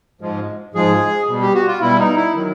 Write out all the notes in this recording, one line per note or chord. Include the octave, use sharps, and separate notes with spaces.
G#2 F3 G#3
G#2 F3 G#3 G#4
B2 G3
G4
F#4
F4
B2 G3 E4
D#4
E4
D#3 F#3